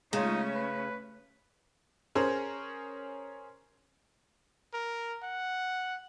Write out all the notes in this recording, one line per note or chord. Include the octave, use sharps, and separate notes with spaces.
C#3 G#3 A3 C#4 D#4 F4
B4
C#4 G#4 A#4 C5 C#5
A#4
F#5